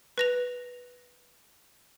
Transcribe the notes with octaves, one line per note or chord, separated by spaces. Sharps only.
B4 A#6 F7